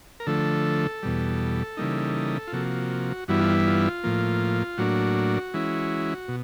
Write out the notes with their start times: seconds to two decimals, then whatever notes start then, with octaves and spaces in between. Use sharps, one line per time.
0.20 A#4
0.26 D3 F3 A3 A4
1.03 E2 B2 G3
1.77 C#3 E3 G3 A#3 D#4
2.47 F4
2.52 C3 F3 A#3 F#4
3.28 G2 E3 G3 B3 E4 F#4
3.41 F4
3.67 F4
4.04 A2 F3 A#3
4.78 A2 F#3 A#3 D4 F#4
5.54 E3 G#3 C#4 E4
6.28 B2